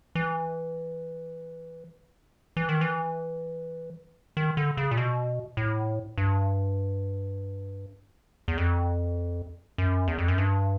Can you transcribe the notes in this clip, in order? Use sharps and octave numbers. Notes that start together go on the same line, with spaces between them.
E3
E3
D#3
E3
D#3
D3
C#3
A#2
B2
A2
G2
E2
F2
F#2
E2
F2
F#2
G2